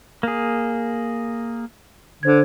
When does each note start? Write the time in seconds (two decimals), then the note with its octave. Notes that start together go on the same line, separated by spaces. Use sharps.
0.23 A#3 G#4
2.23 D3 C5 G#6